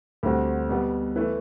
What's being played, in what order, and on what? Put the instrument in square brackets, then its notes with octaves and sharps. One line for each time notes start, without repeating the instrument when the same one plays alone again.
[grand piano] D2 D3 G3 C4 F#4
B2 G3 B3
E3 A3 E4 B4